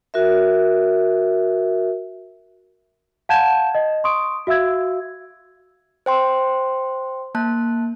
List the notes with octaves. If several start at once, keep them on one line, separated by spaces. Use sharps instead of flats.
F#4 A#4 E5
F5 F#5 A5 G6 G#6 E7
D#5
C6 C#6 D#6 D7
F#4 E5 F5 E6 G#6
C5 G5 C6
A#3 A5 F#6